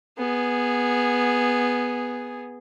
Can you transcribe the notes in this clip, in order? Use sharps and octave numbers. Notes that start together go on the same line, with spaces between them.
B3 G#4